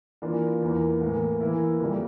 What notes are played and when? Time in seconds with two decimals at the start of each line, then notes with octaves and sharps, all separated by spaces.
0.22 E3 A#3 D4 F4
0.62 E2 E3 A#3
1.01 A2 E3 A#3
1.41 E3 A#3 E4
1.80 F2 C#3 G3 A#3